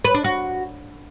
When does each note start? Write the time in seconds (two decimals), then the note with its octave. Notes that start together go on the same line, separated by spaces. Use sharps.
0.05 B4
0.15 D4
0.24 F#4